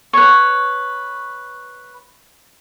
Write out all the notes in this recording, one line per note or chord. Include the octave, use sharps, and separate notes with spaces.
B4 C#5